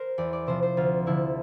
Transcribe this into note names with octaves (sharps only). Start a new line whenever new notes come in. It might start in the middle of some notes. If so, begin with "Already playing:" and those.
Already playing: A#4 C5
E2 D5
D5
C3 F3 C5
C5
D2 F4
D3 F3 E4